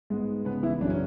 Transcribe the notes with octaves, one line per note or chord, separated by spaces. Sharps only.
G#2 G#3 B3
C#3 G#3 B3 B4
E3 E4
F#2 C#3 F#3 D4
C#4